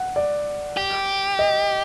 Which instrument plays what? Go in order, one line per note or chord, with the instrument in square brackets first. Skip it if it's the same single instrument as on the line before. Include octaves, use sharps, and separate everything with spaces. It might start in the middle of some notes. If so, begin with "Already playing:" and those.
Already playing: [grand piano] F#5
D5
[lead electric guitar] G4
[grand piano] D#5